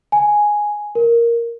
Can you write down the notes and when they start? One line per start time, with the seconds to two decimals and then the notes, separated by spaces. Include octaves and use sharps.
0.12 G#5
0.95 A#4